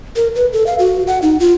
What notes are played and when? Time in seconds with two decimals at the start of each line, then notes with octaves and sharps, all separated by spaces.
0.16 A#4
0.35 B4
0.53 A4
0.67 F5
0.79 F#4
1.07 F#5
1.22 D#4
1.40 F4